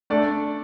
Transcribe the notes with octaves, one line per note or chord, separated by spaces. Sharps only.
A3 D4 A4 D5